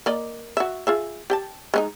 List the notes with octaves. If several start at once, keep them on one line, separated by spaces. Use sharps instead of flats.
A#3 D5 D#5
F#4 E5
F4 G#4 E5
G4 G5 A5
G#3 C#4 D#4